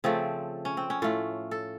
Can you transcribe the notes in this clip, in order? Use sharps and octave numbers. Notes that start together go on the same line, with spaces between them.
C#3 F3 A3 C4
C#4
C4
C#4
A2 A3 F4
A4